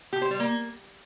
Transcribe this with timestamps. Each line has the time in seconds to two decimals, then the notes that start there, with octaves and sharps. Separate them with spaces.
0.13 G4
0.22 C5
0.31 G3
0.40 A#3